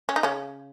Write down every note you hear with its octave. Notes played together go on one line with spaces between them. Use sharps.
C#4
D#4
C#3 C#4